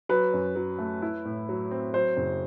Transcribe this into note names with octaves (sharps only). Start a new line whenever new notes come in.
F#3 B4
F#2
F#3
A3
E4
A2
F#3
C4
F#3 C5
F#1